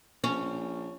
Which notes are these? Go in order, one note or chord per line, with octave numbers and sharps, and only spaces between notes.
A#1 C#4